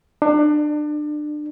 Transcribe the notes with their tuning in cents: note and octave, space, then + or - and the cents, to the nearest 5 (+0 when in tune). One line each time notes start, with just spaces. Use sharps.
D4 +30